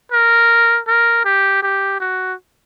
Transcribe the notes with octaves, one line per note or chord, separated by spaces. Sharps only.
A#4
A#4
G4
G4
F#4